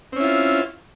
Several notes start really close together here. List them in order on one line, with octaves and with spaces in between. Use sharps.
C4 C#4 E4 F4